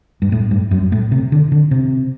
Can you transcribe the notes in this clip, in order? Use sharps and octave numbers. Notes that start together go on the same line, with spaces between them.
G2
A2
G2
F#2
A2
C3
D3
D3
C3